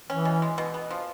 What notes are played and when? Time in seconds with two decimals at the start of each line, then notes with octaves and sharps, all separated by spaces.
0.09 E3 C#4
0.25 B2
0.42 G#3
0.58 B2
0.74 B3
0.91 F3